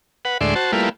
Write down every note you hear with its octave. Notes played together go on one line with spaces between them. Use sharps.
B4 F#5
D2 A2 G#3 D5 E5 C6
F#4 C5 A5
G3 A3 A#3 E4 F4 B4